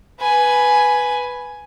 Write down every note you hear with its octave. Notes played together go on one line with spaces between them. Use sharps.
B4 G#5